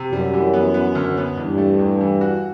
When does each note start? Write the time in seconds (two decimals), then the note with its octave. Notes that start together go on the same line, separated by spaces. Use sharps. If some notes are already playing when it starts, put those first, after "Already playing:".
Already playing: C3
0.12 F#2 G3
0.34 E3
0.53 B3
0.74 B3
0.95 D2
1.17 B3
1.37 E2 G2
1.58 A3
1.79 E2
2.01 E3
2.21 F#4